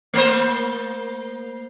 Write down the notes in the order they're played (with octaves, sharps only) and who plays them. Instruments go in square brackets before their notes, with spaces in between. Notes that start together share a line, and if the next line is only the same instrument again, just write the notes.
[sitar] A3 A#3 C5